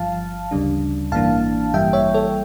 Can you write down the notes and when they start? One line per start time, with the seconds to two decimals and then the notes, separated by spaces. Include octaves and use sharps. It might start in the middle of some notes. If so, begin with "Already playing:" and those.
Already playing: G1 G2 F3 F5 A5
0.51 D2 C#3 G3 D4
1.12 A1 G2 E3 A#3 D4 F5 A5
1.74 A1 G2 E3 G3 A#3 E5 G5
1.93 C#5 E5
2.14 A4 C#5